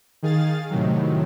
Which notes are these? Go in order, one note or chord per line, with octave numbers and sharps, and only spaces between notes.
D#3 G#4 F5 A6
A2 C3 D#3 F#3